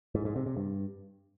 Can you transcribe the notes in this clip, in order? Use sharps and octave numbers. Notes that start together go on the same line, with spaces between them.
G#2
G#2
C3
C3
G2